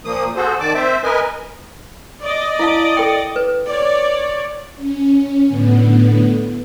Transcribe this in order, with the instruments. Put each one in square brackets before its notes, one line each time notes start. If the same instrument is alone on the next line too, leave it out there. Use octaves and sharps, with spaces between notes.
[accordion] A#2 F3 A#3 D#6
F#4 G#4 A4 C5
D#3 D5 A5 D6
C4 C5 E5
A#4 B4 D#5 G#5
[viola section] D5 D#5
[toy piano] E4 F5 A5
A4 G5
B4
[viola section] C#5 D5
[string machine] C#4
A2 D3 B3